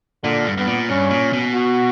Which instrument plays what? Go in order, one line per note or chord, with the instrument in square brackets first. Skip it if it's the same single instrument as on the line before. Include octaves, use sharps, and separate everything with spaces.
[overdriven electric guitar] A#2 [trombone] D3
[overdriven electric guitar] G2
[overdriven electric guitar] G2 [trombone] B3
[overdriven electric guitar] A#2
[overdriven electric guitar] G2 [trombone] C#4
[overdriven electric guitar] A#2
B2
[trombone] F#4